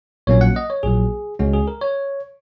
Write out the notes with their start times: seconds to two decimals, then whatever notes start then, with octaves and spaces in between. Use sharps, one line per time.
0.27 A#1 A#2 F#3 A#3 C#4 C#5
0.41 F#5
0.56 D#5
0.70 C#5
0.83 A#1 A#2 F#3 G#4
1.39 C#2 C#3 G#3 C#4 F#4
1.53 G#4
1.68 A#4
1.81 C#5